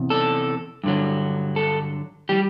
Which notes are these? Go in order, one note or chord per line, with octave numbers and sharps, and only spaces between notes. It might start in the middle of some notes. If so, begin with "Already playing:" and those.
Already playing: E2 C3
A4
G2 D3 F#3
A4
E3 G3 G4